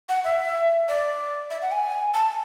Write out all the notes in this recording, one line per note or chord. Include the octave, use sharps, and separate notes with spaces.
F#5
E5
D5
E5
F#5
G#5
A5